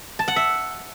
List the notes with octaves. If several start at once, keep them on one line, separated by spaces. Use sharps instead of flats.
A5
F#5
E5